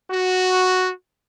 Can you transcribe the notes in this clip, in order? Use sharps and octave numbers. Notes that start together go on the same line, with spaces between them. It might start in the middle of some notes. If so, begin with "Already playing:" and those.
F#4